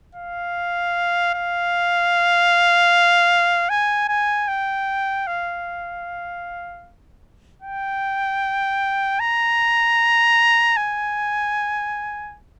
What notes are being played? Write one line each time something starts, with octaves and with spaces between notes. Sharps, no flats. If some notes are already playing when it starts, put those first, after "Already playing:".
F5
F5
G#5
G#5
G5
F5
G5
A#5
G#5